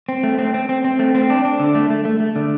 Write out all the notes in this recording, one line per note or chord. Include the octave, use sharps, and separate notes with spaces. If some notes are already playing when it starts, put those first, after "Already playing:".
C4
A3
C4
C4
C4
C4
A3
C4
D4
D4
D3
A3
A3
A3
A3
D3